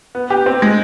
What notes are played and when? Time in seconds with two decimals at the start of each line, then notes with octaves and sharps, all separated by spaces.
0.15 B3
0.30 G4
0.46 C4
0.62 G#3